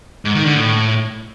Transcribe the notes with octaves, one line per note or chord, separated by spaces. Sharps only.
G#2
D#3
D3
A2